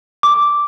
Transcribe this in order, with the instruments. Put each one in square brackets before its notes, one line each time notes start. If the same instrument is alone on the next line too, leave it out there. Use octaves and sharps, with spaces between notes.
[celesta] D6